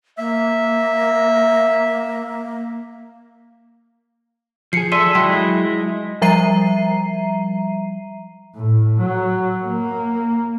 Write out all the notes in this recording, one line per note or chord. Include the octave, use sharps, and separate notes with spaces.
A#3 E5
F3 G#4 C7 C#7
A4 D5 E5 C6 D#7
F#3 G#3 E4 G5 C6
F3 G3 E5 A#5 C7 D#7
A2
F#3
A#3